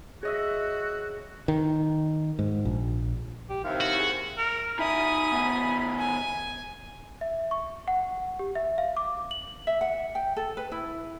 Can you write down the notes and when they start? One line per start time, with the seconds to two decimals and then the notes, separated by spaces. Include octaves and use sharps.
0.23 F#4 G#4 C#5 D#5 E5
1.48 D#3
2.39 G#2
2.65 A#1
3.50 G4
3.64 D#2 C3 E4 F5
3.81 F#4
3.99 G#4
4.38 A#4
4.79 D#4 E5 G#5 B5 D#6
5.32 D#3 B3
5.99 G#5
7.21 E5
7.51 C#6
7.88 F#5
8.39 G4
8.55 E5
8.78 F5
8.97 D6
9.31 F#7
9.67 E5
9.81 F#5
10.15 G5
10.36 A4
10.57 B4
10.72 E4